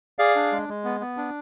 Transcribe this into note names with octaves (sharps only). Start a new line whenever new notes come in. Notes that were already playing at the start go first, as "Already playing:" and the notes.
G#4 D5 F5
D4
G#3
G#3
B3
B3
D4